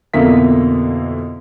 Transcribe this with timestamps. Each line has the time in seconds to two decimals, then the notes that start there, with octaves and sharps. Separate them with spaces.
0.14 F2 B2 D3 A#3 E4 B6